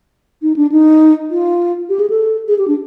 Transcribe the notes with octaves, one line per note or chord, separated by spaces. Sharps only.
D#4
D4
D#4
F4
G4
G#4
A4
G#4
G4
D4